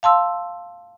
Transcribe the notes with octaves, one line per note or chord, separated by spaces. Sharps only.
F5 A5 C6 E6